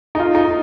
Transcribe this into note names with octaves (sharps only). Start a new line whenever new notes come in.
D#4
F4
D#4